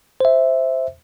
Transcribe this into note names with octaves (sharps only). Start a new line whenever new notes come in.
C5 E5